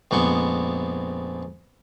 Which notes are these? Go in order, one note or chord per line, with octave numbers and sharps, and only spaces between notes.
A#1 F2 G#3 B3 C#6